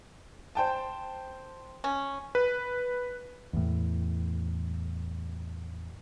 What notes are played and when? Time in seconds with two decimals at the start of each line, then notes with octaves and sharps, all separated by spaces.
0.55 C5 G5 A5
1.84 C#4
2.35 B4
3.53 E2 A2